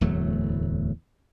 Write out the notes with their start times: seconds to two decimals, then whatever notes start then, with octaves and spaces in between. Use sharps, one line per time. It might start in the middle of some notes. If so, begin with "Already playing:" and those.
0.01 D1 E2 F#3 A3